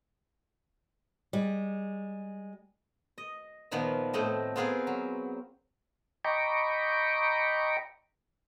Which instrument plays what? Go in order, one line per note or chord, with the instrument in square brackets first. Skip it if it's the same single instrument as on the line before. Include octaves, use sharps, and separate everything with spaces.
[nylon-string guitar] G3 G#3
[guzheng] D#5
A#2 D#3 F3 B3
A2 A3 C4 D#5
B3 C4 F4 G#4 A#4 B4
F#3
[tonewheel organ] D#5 G5 A#5 B5 C#6 D6